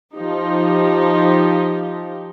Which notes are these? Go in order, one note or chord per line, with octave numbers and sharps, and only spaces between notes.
F3 D#4 G4